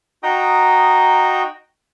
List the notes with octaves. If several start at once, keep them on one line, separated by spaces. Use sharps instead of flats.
D#4 F#4 G5 A#5 D#6